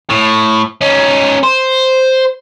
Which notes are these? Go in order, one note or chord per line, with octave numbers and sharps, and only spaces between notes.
A2
C#4 D#4
C5